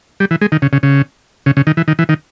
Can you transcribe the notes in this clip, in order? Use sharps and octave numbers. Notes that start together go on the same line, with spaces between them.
G3
E3
G#3
D#3
C#3
C#3
C#3
C#3
C#3
D#3
E3
D#3
E3
D#3